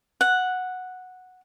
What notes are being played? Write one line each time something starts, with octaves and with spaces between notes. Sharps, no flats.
F#5